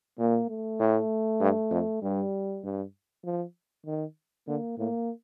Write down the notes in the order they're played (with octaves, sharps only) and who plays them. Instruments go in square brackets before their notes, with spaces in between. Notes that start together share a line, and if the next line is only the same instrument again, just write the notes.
[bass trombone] A#2 [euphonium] A#3
[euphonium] A3
[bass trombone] A2
G2
F2
[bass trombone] G2 [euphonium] G3
[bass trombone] G2
F3
D#3
[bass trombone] D3 [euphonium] A#3
[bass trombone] A2 [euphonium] A#3